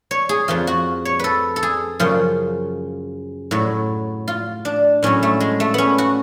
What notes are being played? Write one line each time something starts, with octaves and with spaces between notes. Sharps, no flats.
C#5
G#4
F2 F3 F4
F#4
C#5
A4 B4
A4
G#4
F#2 C#3 F3 F4
A2 F#3
F4
D4
A2 F#3 C#4
A3
G#3
A3
B3 C#4
F#4